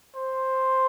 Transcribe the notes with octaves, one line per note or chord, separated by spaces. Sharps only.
C5